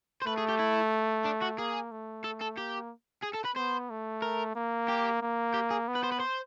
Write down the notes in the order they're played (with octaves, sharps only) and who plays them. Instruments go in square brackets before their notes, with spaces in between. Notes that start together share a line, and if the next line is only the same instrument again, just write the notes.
[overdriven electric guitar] C5
[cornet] A3 [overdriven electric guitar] B4
[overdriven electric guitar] G#4
G4
E4
D4
F#4
[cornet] A#3 [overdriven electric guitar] G#4
[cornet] A3
[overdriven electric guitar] A4
A4
[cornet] A#3 [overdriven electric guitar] G4
[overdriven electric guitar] G#4
A4
B4
[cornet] B3 [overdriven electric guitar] C5
[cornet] A3
[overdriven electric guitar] A#4
[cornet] A#3
[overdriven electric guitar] G4
[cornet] A#3
[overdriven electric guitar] G4
G#4
[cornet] B3
[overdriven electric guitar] B4
C5
B4
C5